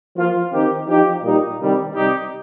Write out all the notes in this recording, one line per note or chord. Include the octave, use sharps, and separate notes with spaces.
F3 A#3 F4
D#3 C4 D#4 G4
F3 D#4 G4
A#2 G3 D#4 G4
C3 D#3 G3
C3 G3 D#4 G4